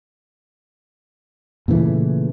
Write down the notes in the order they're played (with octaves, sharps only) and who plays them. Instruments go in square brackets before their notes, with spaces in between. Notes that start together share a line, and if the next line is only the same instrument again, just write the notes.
[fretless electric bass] A#2 C#3 E3 A3